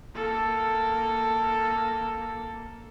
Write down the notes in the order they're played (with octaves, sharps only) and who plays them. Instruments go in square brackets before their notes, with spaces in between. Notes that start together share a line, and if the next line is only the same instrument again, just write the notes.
[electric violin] A#3 A4